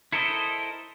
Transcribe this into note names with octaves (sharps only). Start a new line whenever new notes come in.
E4 A4 A#4 C5 D#5